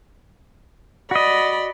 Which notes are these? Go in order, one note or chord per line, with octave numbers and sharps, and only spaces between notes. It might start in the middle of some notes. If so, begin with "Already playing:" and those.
F#4 D5 D#5 B5